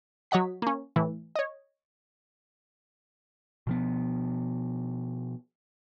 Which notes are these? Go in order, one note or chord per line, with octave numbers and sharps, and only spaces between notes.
F#3 C#5 D#5 F#5 B6
A#3 C#4
A2 E3
C#5 D#5
B2 F3 B3